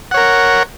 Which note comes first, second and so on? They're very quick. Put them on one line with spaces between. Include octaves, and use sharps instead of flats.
F#5 C#5 A#4